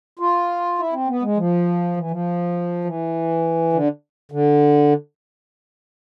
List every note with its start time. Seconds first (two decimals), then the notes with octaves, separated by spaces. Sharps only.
0.19 F4
0.79 E4
0.93 C4
1.08 B3
1.22 G#3
1.37 F3
1.96 E3
2.11 F3
2.85 E3
3.73 D3
4.32 D3